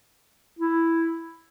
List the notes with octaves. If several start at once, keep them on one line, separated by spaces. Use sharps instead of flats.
E4